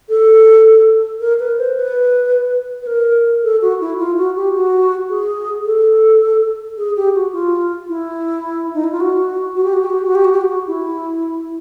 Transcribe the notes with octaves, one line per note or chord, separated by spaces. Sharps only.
A4
A#4
B4
C5
B4
B4
A#4
A4
F#4
E4
F4
F#4
G4
F#4
G#4
A4
G#4
G4
F#4
F4
E4
D#4
E4
F4
F#4
F#4
G4
F#4
G4
F#4
G4
F#4
G4
F#4
G4
F#4
E4